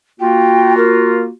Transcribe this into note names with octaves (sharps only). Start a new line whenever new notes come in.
A#3 F4 F#4 G5
A#4